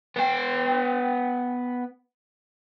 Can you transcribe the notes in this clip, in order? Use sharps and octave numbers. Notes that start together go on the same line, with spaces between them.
B3 G5